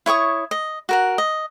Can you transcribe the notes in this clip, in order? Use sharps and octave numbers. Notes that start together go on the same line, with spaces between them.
E4 C#5 C#6 D#6
D#5
F#4 A#4 F#5
D#5